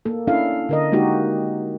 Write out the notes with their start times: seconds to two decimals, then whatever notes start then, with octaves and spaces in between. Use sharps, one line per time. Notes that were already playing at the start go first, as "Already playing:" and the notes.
0.05 A#3 A4
0.27 C#4 D4 E4 A4 F5
0.69 D3 A#4 D#5
0.92 G#3 A#3 D#4 F#4 G4